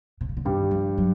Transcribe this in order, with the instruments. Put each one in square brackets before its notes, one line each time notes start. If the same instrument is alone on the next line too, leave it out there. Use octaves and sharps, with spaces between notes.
[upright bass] C3
C#3
D3
[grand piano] G2 G3 [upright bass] D#3
[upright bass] F3
F#3